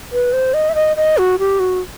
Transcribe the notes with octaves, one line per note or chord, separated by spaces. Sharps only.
B4
C5
D#5
E5
D#5
D#5
F#4
G4
F#4